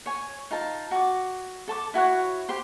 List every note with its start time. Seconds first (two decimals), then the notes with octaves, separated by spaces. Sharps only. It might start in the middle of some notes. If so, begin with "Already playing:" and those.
0.06 C#5 G#5
0.51 D#4 F4 A5
0.91 F#4 D6
1.68 A4 A5 C#6 D6
1.94 E4 F#4 C#5 F#5
2.49 G4 C5 C6